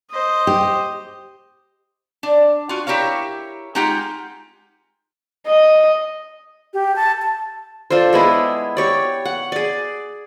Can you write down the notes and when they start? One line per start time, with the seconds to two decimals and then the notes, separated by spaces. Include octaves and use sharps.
0.11 C5 D#5
0.47 G4
2.23 D4
2.69 F4 F#4
2.87 E4 G4 A#4 C#5 F5
3.75 G#3 D#4 F4 G4 F#5 G5
5.47 D#5
6.74 G4
6.96 A5
7.22 A5
7.90 D4 F4 A4 C5
8.13 G#3 B3 E4 G#4
8.77 G4 C#5 D5
9.25 F#5
9.52 G#4 D5